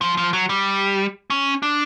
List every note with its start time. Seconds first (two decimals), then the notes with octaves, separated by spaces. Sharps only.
0.02 F3
0.17 F3
0.33 F#3
0.49 G3
1.30 C#4
1.63 D4